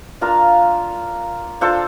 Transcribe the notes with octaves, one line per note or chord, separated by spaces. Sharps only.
D4 F4 A#4 F5
D4 F4 A4 C5